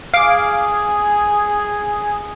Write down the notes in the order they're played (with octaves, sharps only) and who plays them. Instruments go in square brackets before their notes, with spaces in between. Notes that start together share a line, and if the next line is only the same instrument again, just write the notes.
[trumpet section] G#4 [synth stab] F5 D6